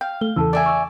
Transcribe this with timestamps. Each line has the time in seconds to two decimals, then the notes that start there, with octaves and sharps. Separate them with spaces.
0.01 F5 G5
0.21 A3 G7
0.36 E2 C#3 E3 A4 A5 E6
0.53 D5 E5 G#5
0.66 C#6 E6